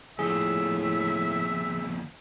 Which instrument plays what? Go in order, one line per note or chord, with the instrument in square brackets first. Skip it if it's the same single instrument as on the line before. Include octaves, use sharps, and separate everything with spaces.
[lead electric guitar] D#2 F3 [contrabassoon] A2 [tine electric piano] G#4 [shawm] E5